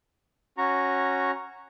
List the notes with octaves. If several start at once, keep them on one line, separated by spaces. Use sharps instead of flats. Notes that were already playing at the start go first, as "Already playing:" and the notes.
C#4 F#4 A#5 C#6